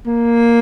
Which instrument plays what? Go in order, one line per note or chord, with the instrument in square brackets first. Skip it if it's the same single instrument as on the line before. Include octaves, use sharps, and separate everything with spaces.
[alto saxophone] A#3